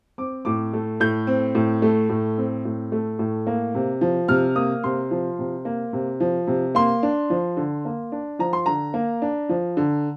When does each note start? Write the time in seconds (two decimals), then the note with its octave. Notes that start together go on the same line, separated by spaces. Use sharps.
0.18 C4 D6
0.45 A2 D6
0.73 A3
1.00 A2 G6
1.27 C4
1.55 A2
1.82 A3
2.09 A2
2.38 C4
2.65 A2
2.92 A3
3.19 A2
3.47 A#3
3.74 C3
4.01 F3
4.28 C3 F6
4.56 A#3 D#6
4.84 C3 C6
5.11 F3
5.39 C3
5.65 A#3
5.93 C3
6.20 F3
6.47 C3
6.75 A#3 C6
7.03 D4
7.30 F3
7.57 D3
7.85 A#3
8.12 D4
8.39 F3 A#5
8.53 C6
8.66 D3 A#5
8.94 A#3
9.22 D4
9.49 F3
9.77 D3